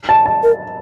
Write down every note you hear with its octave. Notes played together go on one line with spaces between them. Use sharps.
A5
A5
A#4